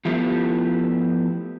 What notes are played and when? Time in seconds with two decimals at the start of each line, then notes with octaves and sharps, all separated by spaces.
0.05 F3 A3 B3 E4 F4 G4